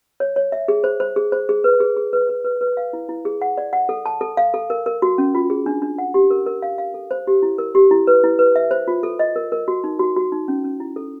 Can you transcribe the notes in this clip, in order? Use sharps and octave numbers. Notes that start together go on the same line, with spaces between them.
C#5
C#5
E5
G#4
C5
C5
G#4
C5
G#4
B4
G#4
G#4
B4
B4
B4
B4
F5
E4
E4
G#4
F#5
D5
F#5
A4
A5
A4
F5
A4
A#4
A#4
F#4
C#4
F4
G#4
D4
D4
F#5
G4
A#4
A#4
F5
F5
A4
C5
G4
E4
A#4
G4
E4
B4
E4
B4
E5
C5
F4
A4
D#5
A#4
A#4
F#4
D#4
F#4
F#4
D#4
C#4
C#4
E4
A4